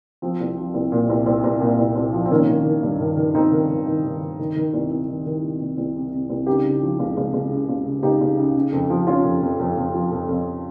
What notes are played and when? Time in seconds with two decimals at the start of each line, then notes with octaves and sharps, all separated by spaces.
0.22 F3 C4
0.40 C2
0.58 F3
0.74 C2
0.92 A#2
1.09 C2
1.26 C2 C4
1.44 C2
1.61 A#2
1.79 C2
1.96 C2
2.13 F3
2.25 C4
2.31 D#3 A#3 C#4
2.48 D#3
2.65 D#3
2.83 G2
3.00 D#3
3.17 D#3
3.35 D#3 C4 D#4
3.52 D#3
3.69 D#3
3.87 D#3
4.05 D#3
4.22 D#3
4.39 D#3
4.56 D#3
4.74 C2
4.91 C2
5.08 D#3
5.26 D#3
5.42 C3
5.60 C2
5.77 C2
5.95 C3
6.12 C3
6.30 C2
6.47 C#3 D#4 G4
6.64 C#3
6.82 F3
6.99 C#2
7.17 C#2
7.33 C#2
7.51 C#3
7.69 C#2
7.86 C#3
8.03 C#2 D#4 G4
8.21 C#2
8.38 C#3
8.55 C#3
8.72 F2
8.90 F3
9.07 F3 C#4 F4
9.25 F2
9.42 F2
9.59 F2
9.77 F2
9.94 F3
10.11 F2
10.29 F2